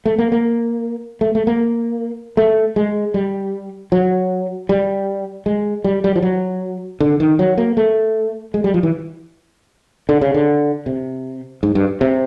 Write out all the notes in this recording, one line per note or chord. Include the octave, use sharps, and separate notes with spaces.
A3
A#3
A#3
A3
A3
A#3
A3
G#3
G3
F#3
G3
G#3
G3
G3
F3
F#3
D3
D#3
F#3
A#3
A3
G#3
G3
F3
E3
D3
C#3
D3
C3
G#2
G2
C3